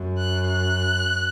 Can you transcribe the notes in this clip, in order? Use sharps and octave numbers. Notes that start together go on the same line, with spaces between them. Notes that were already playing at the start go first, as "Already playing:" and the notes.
Already playing: F#2
F#6
F#6